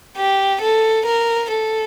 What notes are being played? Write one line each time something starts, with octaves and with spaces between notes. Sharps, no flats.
G4
A4
A#4
A4